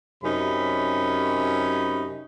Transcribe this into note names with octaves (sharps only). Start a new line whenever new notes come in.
F#2 C3 C#4 D#4 B5